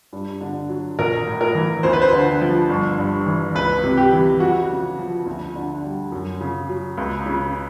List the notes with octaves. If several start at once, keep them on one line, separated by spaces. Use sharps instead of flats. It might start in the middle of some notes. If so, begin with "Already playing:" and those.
G2
D3
F#3
A#1 A#4
A2
A#4
E3
D2 C5
B4
C5
D3
F3
G1
G2
E3
C#2 B4
C3
G4
E3
F2 F#4
C#3
F3
D2
D3
G3
F#2
C#3
F#3
C#2
C#3